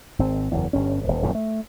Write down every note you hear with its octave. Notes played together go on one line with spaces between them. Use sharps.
G#1 C4
F#1 E2
G1 G2 C#4
D#1 G#1
D#1 F#2 A#2 C#3
A3